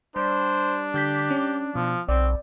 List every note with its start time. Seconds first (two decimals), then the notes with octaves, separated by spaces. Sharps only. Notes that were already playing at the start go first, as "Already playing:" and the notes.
0.16 G3 D4 C5
0.94 D3 G4 G6 B6
1.30 C#4
1.75 B2 F3
2.09 B1 C4 D5